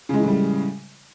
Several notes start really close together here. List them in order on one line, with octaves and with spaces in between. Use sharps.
C#3 G#3 E3 A2 G3